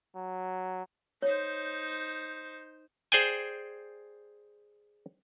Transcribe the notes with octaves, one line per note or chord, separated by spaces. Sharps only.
F#3
D#4 C5 C#5
G#4 C5 D5 G5 G#5